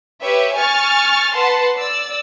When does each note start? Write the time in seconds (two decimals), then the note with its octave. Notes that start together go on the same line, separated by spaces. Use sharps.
0.22 G4 B4 C#5 E5
0.55 G#5 C#6 F6 A6
1.34 B4 F#5 A5 C6
1.77 D5 E6